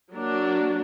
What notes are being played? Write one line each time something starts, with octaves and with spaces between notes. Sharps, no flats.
F#3 A#3 D4